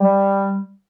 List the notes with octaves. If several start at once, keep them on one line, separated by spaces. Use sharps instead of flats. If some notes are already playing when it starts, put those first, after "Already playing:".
G3